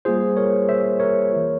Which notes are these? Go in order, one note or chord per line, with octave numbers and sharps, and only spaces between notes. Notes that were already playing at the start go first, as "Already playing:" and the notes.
G3 A#3 F4 G#4 C5
A#4 C#5
C5 E5
A#4 C#5
E3 A#3 F4